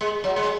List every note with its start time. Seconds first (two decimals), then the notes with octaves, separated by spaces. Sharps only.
0.01 G#3
0.24 F#3
0.36 G#3